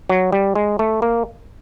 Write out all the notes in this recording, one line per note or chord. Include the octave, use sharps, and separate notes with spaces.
F#3
G3
G#3
A3
A#3